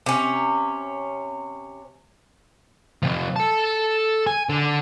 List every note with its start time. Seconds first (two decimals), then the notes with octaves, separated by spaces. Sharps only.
0.06 C3 C#4
3.03 C3 F3
3.36 A4 A5
4.27 G#5
4.49 D3